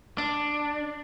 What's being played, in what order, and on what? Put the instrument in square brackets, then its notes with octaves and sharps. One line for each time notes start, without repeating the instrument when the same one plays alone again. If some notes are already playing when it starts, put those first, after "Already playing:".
[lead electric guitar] D4